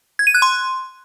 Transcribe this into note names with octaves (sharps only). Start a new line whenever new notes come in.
G#6
D#7
F#6
C6